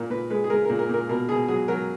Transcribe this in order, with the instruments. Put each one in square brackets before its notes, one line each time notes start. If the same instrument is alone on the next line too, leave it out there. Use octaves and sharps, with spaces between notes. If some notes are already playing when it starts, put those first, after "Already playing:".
Already playing: [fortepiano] A#2 A#4
A#2 B4
G#3 B4
G#4
G#3 A#4
A#2 A#4
A#4
A#2 A#4
B2 A#4
B2 G#4
F#3 G#4
F#3 A#4